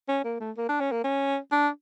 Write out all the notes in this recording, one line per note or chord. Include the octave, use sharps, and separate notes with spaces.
C#4
A#3
A3
A#3
D4
C#4
A#3
C#4
D4